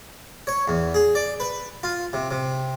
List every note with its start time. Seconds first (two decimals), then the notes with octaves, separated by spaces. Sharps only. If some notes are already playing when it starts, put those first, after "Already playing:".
0.47 C#5
0.68 E2
0.94 G#4
1.15 D5
1.40 B4
1.83 F4
2.13 C3
2.31 C3